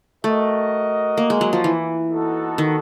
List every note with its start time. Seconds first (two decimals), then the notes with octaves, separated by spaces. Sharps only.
0.24 A3 F#4 A#4 D#5
1.17 A#3
1.30 G#3
1.41 F#3
1.53 F3
1.64 E3
2.11 B3 D#4 F#4 A4
2.58 D#3